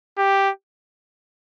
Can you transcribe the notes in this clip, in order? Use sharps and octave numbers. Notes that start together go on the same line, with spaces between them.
G4